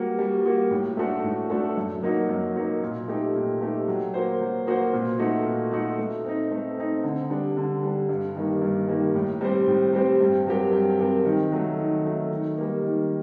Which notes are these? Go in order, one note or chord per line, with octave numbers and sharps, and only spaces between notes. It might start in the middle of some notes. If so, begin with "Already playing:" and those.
Already playing: G3 A#3 F#4
G3
A#3 F#4
A2
A3 D4 F#4 A4
A2
A3 D4 F#4 A4
F#2
F#3 A#3 D#4 F#4
F#2
F#3 A#3 D#4 F#4
A#2
A3 D#4 G4
A#2
A3 D#4 G4
F#3
A#3 F#4 C5
F#3
A#3 F#4 C5
A#2
A3 D#4 F#4
A#2
A3 D#4 F#4
A3
C4 D#4
A3
C4 D#4
D3
G3 D4
D3
G3 D4
G2
D#3 G3 A#3
G2
D#3 G3 A#3
A2
G3 C4 G4 C5
A2
G3 C4 G4 C5
G2
F#3 C4 G4 A#4
G2
F#3 C4 G4 A#4
D#3
F#3 A3
D#3
F#3 A3
D#3
G3 A#3
D#3